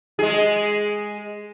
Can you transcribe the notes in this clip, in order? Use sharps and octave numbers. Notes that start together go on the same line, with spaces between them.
G#3 G#4